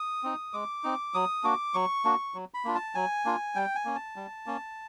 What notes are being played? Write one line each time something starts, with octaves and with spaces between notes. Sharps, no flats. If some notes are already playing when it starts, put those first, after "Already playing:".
Already playing: D#6
C4 D#4
G#3 D6
C4 D#4
F#3 D#6
A#3 D4 F#4 D6
F#3 C#6
A#3 D4 F#4
F#3
B5
A#3 D4 F4
A5
F#3 G#5
A#3 D4 F4
G3 G5
G#5
A#3 C#4
A5
G3
A#3 C#4